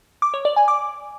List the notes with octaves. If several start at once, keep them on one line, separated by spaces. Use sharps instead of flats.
D6
C#5
D5
G#5
D6